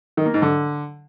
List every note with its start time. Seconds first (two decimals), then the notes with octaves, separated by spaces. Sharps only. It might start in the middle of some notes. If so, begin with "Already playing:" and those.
0.17 D#3
0.26 A#3
0.34 G#2
0.42 D3